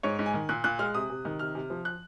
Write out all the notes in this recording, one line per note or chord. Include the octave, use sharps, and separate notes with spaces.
G#2 C#5
G#2
G#5
D#3
A#2 F#6
A#2 F#6
G#3 F6
C3 D#6
C3
D#3
C3 F6
C3
F3
F#6